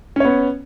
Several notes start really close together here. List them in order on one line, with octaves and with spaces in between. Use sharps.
C#4 C#5 B3